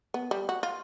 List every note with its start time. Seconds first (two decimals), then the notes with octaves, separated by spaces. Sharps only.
0.14 B3
0.31 G3
0.49 F#4
0.63 F4